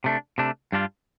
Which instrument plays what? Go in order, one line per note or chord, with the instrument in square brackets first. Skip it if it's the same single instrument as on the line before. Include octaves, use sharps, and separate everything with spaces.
[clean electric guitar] C3 A3 D4
C3 A3 D4
G2 G3 D4 F4